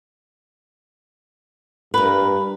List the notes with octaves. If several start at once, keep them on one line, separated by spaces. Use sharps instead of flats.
G2 A#4 B4